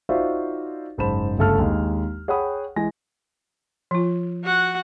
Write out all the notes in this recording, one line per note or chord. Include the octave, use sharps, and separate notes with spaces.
D#4 F4 F#4 C5 D5 E5
F#1 G#2 C5 A5 B5 E7
G1 C#3 A3 A4 A5 F6
D#2 G#3
G#4 C#5 F#5 G5 B5 D#6
E3 G#3 G#5 A#6
F3 F4
F#4 F#5